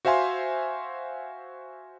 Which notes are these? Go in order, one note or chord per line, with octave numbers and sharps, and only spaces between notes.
F#4 C5 E5 F5 G#5 C6